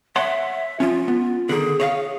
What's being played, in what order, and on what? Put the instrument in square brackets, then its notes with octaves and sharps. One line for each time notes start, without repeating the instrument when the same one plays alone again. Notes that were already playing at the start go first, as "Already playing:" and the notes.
[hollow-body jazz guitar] C#5 F#5 C6 [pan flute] E5
[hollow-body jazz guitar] F3 C#4 [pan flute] F4
[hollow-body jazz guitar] B3
[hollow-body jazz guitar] D3 D#3 [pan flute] G#4
[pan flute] G#4 [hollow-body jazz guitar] C#5 D#5 F5